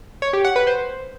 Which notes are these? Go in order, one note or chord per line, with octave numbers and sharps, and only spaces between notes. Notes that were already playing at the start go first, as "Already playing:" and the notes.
C#5
G4
F#5
B4
C5